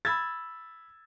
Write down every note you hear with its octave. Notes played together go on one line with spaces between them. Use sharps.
B5 E6 G#6 A6